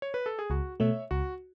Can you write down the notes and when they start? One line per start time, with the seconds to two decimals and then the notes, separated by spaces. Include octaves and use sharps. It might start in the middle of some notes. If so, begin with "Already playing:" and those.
0.02 C#5
0.14 B4
0.26 A4
0.39 G#4
0.50 C#2 F#4
0.80 B2 A3 C#5 E5
1.11 C#2 F#4